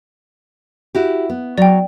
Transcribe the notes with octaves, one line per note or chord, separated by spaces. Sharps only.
E4 F#4 G4
B3
F#3 D5 G5